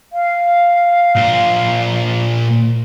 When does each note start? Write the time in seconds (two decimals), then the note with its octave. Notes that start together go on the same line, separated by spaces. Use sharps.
0.12 F5
1.15 A#2 C5